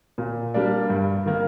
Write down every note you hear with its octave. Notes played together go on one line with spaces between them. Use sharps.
A#2
G3 A#3 D4
G2
D#3 A#3